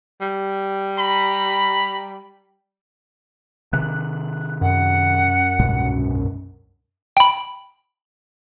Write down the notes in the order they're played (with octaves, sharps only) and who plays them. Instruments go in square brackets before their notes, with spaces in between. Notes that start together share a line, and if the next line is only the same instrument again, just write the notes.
[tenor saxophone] G3
[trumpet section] A#5 B5
[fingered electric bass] C3 D#3 [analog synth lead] F#6
[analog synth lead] F#2 [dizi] F#5
[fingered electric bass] C2 G#2 B2
[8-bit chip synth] G5 B5